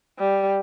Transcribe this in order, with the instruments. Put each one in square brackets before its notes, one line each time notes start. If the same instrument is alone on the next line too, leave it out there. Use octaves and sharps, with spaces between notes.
[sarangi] G3